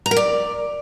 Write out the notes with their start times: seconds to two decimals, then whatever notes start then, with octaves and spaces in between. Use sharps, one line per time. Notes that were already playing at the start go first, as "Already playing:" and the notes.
0.06 A#5
0.11 A#4
0.16 D5